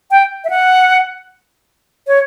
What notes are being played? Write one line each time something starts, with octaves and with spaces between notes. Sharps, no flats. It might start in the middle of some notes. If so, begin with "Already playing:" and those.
G5
E5
F#5
C#5